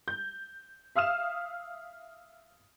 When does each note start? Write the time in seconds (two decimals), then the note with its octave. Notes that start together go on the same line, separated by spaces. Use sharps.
0.08 G6
0.96 E5 F5 D#6 F6 E7